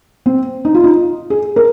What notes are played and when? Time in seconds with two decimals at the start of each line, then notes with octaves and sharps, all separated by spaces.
0.26 C4
0.65 D#4
0.75 F4
0.84 D#4
1.30 G#4
1.56 A#4